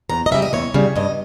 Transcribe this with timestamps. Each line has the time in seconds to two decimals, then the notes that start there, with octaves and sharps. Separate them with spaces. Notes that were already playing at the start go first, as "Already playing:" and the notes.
0.09 E2 A#5
0.26 D#5
0.31 C#3 G3 E5
0.42 D#5
0.53 E2 C#5
0.74 C#3 G3
0.96 G2 D#5